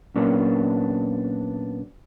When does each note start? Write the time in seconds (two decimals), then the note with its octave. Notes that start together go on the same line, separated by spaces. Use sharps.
0.16 A#2 F#3 A#3 B3 C#4 D4